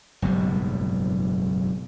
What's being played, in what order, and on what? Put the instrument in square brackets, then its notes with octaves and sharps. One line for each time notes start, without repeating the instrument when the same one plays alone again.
[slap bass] F#1 B1 G#2 G3